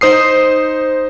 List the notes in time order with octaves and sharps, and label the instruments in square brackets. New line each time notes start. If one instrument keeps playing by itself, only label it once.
[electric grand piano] D#4 C5 D#6 C7